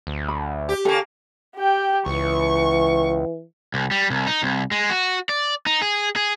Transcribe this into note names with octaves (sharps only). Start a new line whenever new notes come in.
D2
B5
G4
C#3 A#3 G4 A4
G4 G5
C#2 E3 C#6
C2
G3
C2
D#4
C2
G#3
F#4
D5
D#4
G#4
G#4